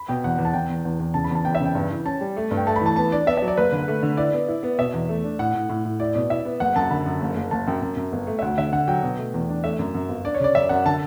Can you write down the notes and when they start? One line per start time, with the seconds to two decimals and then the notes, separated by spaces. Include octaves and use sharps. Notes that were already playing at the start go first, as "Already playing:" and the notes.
Already playing: B5
0.08 B2 G5
0.24 E2 F#5
0.38 E2
0.45 A5
0.53 E2 G5
0.69 E2
0.85 E2
1.00 E2
1.14 C#3 A5
1.24 B5
1.30 E2
1.35 A5
1.45 E2 G5
1.55 E5
1.60 C#3
1.65 G5
1.75 G2
1.90 E3
2.05 C#4 A5
2.21 G3
2.36 A3
2.51 G2
2.57 G5
2.67 A3 A5
2.76 B5
2.81 E3 A5
2.96 B3 A5
3.12 D4 D5
3.27 B3 E5
3.37 E5
3.42 F#3
3.48 D5
3.57 F#1 B4
3.72 D3
3.88 A3
4.03 D3
4.17 E4 D5
4.33 B3
4.48 E4
4.63 B3
4.79 B2 E5
4.94 E2
5.09 A3
5.24 D4
5.39 A2 F#5
5.54 A2
5.69 A2
5.85 A2
6.00 E4 D5
6.14 B2 D5
6.30 E4 E5
6.45 B3
6.60 F#1 F#5
6.76 F#2 A5
6.90 D3 B5
7.06 F#2
7.21 F#1
7.36 F#1
7.51 F#1 A5
7.67 F#2 G5
7.82 F#2
7.97 F#2
8.12 G1
8.27 A3
8.39 E5
8.42 D2 F#5
8.58 D3 E5
8.73 D3 F#5
8.88 F#3 G5
9.03 B2
9.18 A3
9.34 E2
9.49 D4
9.64 A3 E5
9.79 F#2
9.94 F#2
10.09 G1
10.25 D4 D5
10.34 C#5
10.40 C#3 D5
10.55 F#2 E5
10.69 F#2 F#5
10.85 D3 A5